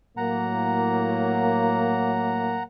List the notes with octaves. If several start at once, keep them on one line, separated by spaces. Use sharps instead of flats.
A2 F#3 A#3 F#5 A#5